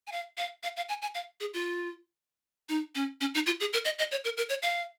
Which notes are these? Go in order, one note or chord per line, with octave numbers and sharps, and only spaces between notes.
G#5
F5
F5
F5
F5
G#5
G#5
F5
G#4
F4
D#4
C#4
C#4
D#4
F4
G#4
A#4
D#5
D#5
C#5
A#4
A#4
C#5
F5